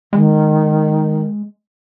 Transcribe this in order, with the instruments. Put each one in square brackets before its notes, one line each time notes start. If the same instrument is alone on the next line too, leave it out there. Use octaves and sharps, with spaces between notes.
[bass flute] D#3 [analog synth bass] G#3